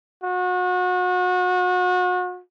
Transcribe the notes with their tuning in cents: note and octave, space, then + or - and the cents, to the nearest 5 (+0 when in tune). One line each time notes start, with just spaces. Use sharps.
F#4 -35